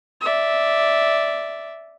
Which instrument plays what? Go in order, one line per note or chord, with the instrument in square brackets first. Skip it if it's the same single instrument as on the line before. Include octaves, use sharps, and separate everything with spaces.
[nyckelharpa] D5 E5